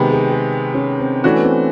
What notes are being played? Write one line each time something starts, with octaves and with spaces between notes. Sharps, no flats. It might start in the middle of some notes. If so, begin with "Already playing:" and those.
Already playing: C3 D#3 G#3 B3 G4
G#4
G#4
C#4
C4
E3 A3 C#4 D4 F#4
B3
C4